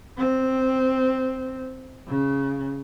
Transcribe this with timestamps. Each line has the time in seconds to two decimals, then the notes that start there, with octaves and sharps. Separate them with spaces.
0.17 C4
2.08 C#3